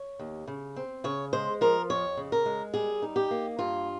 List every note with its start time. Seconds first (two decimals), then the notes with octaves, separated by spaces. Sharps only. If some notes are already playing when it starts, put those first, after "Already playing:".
Already playing: C#5
0.19 D#2
0.47 C#3
0.76 C4
1.04 C#3 C#5
1.33 G#3 C5
1.61 F3 A#4
1.90 F2 C#5
2.17 C#3
2.32 A#4
2.46 G#3
2.74 G3 G#4
3.02 D#4
3.16 G4
3.31 A#3
3.59 G2 F4